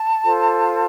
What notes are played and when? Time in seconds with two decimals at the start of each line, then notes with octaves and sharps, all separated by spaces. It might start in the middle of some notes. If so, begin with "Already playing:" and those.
Already playing: A5
0.23 F4 A4 C5